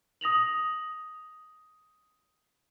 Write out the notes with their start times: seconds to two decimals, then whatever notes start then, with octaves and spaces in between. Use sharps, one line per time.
0.21 D#6 A#6 F7 F#7